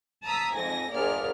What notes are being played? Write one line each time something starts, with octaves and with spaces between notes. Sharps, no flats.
A5 A#5 D#6 E6 B6
F2 G#2 A4 G#5 A#6
G1 A#3 G#4 A#4 D5 F6